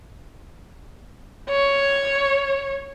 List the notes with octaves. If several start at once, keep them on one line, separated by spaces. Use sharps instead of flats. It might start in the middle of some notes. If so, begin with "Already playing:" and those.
C#5